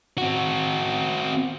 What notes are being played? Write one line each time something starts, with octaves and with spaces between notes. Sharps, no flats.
C4 F#4